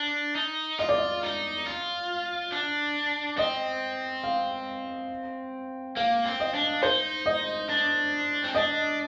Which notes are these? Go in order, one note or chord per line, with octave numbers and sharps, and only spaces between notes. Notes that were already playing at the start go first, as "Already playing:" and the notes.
Already playing: D4
D#4
F4 D#5
D5
D#5
D#4
F4
D4
C4 D#5
F5
A#3 F5
C4
D#5
D4
D#4 C5
D#5
D4
C4
D4 D#5